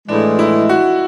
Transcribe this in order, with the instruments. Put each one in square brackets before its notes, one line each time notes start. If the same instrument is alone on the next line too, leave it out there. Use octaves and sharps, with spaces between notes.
[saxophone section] A2 E3 G#3 [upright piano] D4
[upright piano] E4
F#4